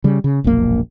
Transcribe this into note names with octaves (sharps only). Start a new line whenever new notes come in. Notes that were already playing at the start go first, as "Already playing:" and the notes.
C#3 G3
C#3
E1 A#1 F#2 A#3